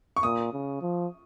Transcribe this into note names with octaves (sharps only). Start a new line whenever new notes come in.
C#6
A#2 D#6
C#3
F3